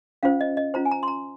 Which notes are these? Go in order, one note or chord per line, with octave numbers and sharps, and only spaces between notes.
C#4 F4 C5 F5
D#5
D#5
C#4 F4 C5 A#5
G#5
A#5
C6
A#5